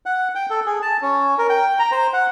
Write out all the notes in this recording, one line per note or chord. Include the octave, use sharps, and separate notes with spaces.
F#5
G5
A4
G#4
A5
C#4
A#4
G5
A#5
C5
F#5